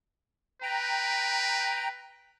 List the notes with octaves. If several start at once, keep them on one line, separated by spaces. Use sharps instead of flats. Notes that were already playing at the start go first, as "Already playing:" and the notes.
B4 G5 A#5